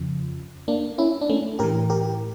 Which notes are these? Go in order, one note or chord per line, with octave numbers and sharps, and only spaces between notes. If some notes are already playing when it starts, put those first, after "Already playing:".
Already playing: F2 C#3 F3
A#3 D4
C#4 E4
D4
A3 C#4
A2 E3 G4 A#4
G4 A#4